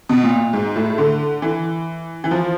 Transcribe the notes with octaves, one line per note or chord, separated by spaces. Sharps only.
B2
A#2
G#2
A2
D3
E3
E3
F3